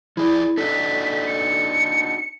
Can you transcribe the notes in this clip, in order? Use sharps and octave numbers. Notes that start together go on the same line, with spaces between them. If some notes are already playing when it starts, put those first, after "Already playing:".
F3 E4 G#4 D5
D4 D#4 F#4 A4 B6
C#7